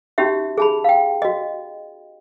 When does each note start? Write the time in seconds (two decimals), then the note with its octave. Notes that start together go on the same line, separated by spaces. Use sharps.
0.18 C#4 D#4 F#4 G4 E5
0.58 G#4 A5 B5
0.84 F5 G5
1.22 F#4 D#5